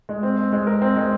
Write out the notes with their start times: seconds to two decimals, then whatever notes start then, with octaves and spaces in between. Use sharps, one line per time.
0.09 G#3
0.23 C4
0.38 C4
0.52 G#3
0.67 A#4
0.82 C4
0.96 G#3